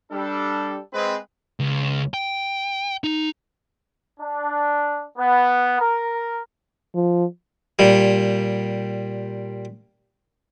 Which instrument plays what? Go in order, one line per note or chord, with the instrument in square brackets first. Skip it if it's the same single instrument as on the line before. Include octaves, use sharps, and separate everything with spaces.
[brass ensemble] G3 D4 A4
G#3 C4 B4
[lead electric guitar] C#2
G5
D#4
[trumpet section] D4
B3
A#4
[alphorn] F3
[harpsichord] A#2 G3